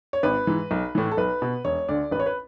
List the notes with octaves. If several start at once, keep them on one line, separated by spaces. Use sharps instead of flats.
C#5
G#1 B4
G#2 E3
B1
A2 E3
A4
B1 B4
B2
E1 C#5
D2 D3 D5
A1 B4
C#5
B4